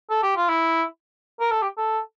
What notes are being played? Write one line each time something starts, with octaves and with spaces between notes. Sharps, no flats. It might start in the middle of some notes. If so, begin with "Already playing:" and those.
A4
G4
F4
E4
A#4
A4
G4
A4